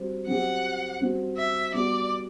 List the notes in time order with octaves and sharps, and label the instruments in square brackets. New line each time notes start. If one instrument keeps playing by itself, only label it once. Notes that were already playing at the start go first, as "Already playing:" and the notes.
Already playing: [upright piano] G3 C4 F#4
[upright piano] F#3 C4 G4 [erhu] F#5
[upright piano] G3 C4 F#4
[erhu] E5
[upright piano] G3 B3 F#4 [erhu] D5